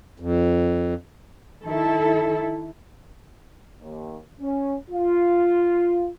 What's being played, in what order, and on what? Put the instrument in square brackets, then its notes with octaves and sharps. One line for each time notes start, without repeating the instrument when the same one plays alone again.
[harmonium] F2
[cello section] D#3 E4 A4
[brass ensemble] D#2
C#4
F4